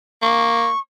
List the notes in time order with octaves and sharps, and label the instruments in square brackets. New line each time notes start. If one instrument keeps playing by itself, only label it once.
[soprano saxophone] A#3 [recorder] C#6